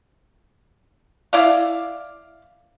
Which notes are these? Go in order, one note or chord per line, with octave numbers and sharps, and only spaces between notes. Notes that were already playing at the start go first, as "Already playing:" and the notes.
E4 D5 F5